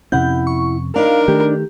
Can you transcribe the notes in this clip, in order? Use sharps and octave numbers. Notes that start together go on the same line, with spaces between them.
F2 C3 C#4 E4 F#5 G6
C#6
D4 D#4 A#4 F5
D#3 A3 G4